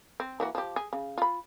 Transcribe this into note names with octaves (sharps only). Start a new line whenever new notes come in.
C4
E3 A#3 F#4
F3 G4
G#4
C#3
F4 B5